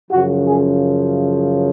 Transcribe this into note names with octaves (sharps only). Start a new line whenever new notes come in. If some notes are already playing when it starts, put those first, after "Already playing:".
F#2 C#3 F3 F#4
G#4